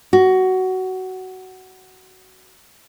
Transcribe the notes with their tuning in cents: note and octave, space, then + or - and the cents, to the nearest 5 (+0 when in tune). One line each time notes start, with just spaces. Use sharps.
F#4 +15